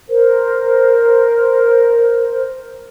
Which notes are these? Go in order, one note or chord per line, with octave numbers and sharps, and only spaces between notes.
A#4 C5